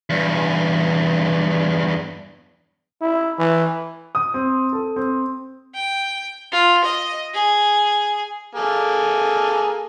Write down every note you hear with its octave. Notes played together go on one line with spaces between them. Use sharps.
E2 G2
E4
E3
D#6
C4
A4
C4
G5
F4
D#5
G#4
A#3 G#4 A4